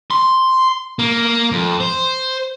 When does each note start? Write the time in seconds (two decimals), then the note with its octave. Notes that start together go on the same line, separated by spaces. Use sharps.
0.11 C6
0.99 A#3
1.52 F2
1.80 C5